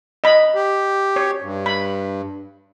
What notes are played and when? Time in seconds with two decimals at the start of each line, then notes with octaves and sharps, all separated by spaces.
0.24 D#5 B5
0.55 G4
1.16 C#5
1.42 G2
1.66 B5